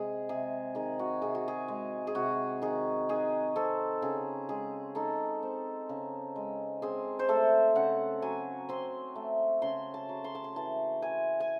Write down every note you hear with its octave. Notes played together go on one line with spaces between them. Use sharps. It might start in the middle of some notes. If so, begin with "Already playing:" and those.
Already playing: C3 G#3 G#4
C3 G#4
D#3 G#4
F#4
C3 G#4
F#4
G#4
G#3
G#4
C3 F#4
D#3 G#4
D#4 G#4
C4 A4
C#3 G#4
G#3 G#4
D#4 A4
C4
C#3
G#3
C4 G#4
C5
A3 A4
C#3 F#5
F#3 G#5
C4 C6
A3
C#3 C6
A5
F#3
C6
A5
C6
E3 A5
E4 G#5
G#5